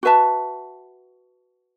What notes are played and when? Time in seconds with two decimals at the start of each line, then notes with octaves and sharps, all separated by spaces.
0.03 F#4 B4 E5 A5